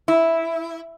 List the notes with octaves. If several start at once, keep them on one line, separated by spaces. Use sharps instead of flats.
E4